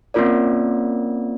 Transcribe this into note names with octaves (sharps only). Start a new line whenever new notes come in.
A#3 C4 C#4 F4 A#4 D5